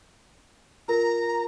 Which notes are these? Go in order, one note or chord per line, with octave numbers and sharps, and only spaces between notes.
F4 A#4 A#5